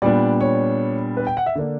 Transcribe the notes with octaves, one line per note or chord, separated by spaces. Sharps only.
A#2 G3 B3 D4 D5
C#5
B4
G5
F#5
E5
D3 A#3 D4